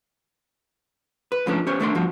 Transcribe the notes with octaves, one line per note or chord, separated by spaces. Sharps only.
B4
G#2 F3 A3 C#4 D4
C#4 G4 C5 C#5
D#2 A3 A#3 D4 D5 C6
G2 F3 F#4